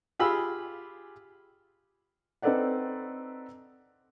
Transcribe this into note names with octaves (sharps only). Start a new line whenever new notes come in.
F4 G4 G#4 B5 E6
C4 D#4 A4 B4 D5 F#5